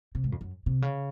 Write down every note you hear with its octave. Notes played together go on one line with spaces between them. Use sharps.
C3
G#2
F2
F#2
C3
C#3